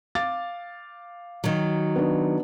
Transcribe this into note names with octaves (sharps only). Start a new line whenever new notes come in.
F5 D6 A6
D#3 F#3
B3 D4